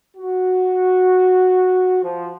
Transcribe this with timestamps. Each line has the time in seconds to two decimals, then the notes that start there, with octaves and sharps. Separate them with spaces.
0.17 F#4
2.03 F3